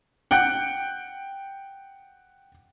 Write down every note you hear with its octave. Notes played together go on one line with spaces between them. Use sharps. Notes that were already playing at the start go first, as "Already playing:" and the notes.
F#5 G5 F#6